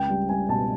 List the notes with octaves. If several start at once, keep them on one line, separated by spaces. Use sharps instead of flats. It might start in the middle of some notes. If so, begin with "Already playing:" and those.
Already playing: C#2 G5
G3
G3 G#5
B2 A5